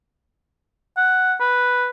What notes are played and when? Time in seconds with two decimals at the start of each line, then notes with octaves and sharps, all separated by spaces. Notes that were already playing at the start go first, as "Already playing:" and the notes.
0.97 F#5
1.40 B4